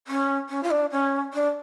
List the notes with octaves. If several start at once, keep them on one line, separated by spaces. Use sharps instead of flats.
C#4
C#4
F4
D4
C#4
D4